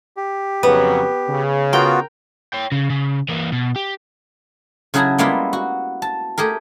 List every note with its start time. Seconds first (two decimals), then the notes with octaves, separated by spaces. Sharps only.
0.17 G4
0.63 F2 C#3 F#3 B3
1.28 C#3
1.73 B3 F4 F#4 A#4 G5
2.53 C#5 G5
2.72 C#3
2.90 C#3
3.28 E3 A#3
3.52 B2
3.76 G4
4.94 C#3 F#3 E4 G#4 A5 A#5
5.18 G3 G#3 A#3 B3 E4 F4
5.53 F#4
6.02 A5
6.38 A3 G4 G#4 A#4